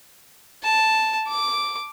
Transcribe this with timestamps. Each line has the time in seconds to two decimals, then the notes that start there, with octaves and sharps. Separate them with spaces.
0.63 A5
1.28 D6